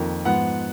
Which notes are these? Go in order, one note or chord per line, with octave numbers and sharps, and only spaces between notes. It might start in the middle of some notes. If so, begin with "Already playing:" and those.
Already playing: F2 D#3 A#3
G#2 F3 B3 F#5